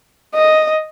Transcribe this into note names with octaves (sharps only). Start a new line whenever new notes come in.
D#5